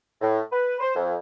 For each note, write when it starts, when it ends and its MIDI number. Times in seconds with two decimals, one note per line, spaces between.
0.21 0.41 45
0.52 0.76 71
0.80 0.95 72
0.96 1.16 41